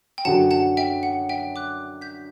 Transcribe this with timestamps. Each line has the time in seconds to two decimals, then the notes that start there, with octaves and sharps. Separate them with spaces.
0.18 G5
0.25 F#2 D3 F#3 F#5 A5
0.51 F#5 A5
0.77 E5 G5
1.03 F#5
1.29 E5 G5
1.56 D6 F#6
2.01 G6 B6